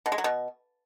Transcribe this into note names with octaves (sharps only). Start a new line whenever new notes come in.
B2
G#3
F#3
B2